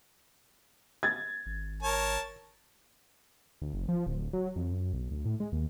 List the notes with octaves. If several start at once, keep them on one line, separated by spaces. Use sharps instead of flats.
G#6 A6
G#1
A#4 C#5 A5
D2
F#1
F3
D1
F#3
F2
F#2
B1
D2
A2
G#3
D#2